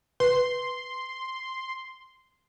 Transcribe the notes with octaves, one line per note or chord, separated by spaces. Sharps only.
B4 C6